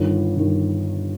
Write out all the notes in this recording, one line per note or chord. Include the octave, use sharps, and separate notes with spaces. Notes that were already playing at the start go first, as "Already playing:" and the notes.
Already playing: G1 G2 D#3
G1 G2 D#3